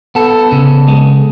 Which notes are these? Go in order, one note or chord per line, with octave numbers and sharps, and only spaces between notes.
B3 A4
C#3
G#3